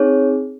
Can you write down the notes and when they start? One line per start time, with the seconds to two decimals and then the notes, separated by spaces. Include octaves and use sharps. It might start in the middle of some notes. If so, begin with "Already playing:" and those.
Already playing: C4 D#4 G#4 C#5